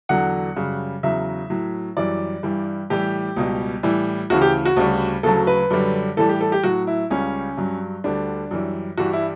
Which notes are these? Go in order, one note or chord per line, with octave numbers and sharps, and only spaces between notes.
E2 D3 F#3 F#5
F#2 C#3 G3
E2 C#3 F#3 E5
A2 F#3
F#2 E3 G3 D5
G2 E3 G3
A2 E3 G3 G4
C#2 B2 G3
A2 E3 G3
D2 C#3 E3 F#4
G4
F#4
D2 C#3 G3
D2 C#3 F#3 A4
B4
F#2 D3 G3
A2 E3 G3 A4
G4
A4
G4
A2 F#3 F#4
E4
C#2 C#3 G3 C#4
G2 F#3
D2 D3 G3 D4
F#2 E3 G3
G2 E3 G3 F#4
E4